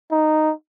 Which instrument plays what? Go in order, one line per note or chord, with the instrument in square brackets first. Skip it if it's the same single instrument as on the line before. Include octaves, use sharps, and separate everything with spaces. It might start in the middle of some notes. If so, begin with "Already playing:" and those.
[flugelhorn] D#4